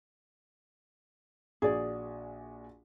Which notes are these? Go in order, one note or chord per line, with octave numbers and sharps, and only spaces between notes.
A#1 F#4 G#4 D5 G#5